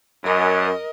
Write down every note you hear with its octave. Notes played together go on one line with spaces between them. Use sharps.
F#2 A#4 D#5